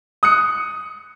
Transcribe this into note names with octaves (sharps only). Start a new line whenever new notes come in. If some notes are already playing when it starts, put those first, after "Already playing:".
D#6 F#6 C#7